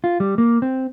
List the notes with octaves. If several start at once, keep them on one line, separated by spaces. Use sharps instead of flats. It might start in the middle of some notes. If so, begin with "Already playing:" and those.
F4
G3
A#3
C4